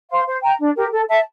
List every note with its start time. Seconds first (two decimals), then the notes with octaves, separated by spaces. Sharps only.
0.10 C5 F5 C6
0.26 C5
0.43 G5 A#5
0.59 D4
0.76 G4 A#4
0.92 A4
1.08 E5 A5